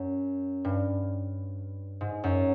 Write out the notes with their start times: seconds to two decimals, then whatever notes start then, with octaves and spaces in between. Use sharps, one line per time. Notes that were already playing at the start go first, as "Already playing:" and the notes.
Already playing: F#2
0.64 G2
2.01 G#2
2.24 F#2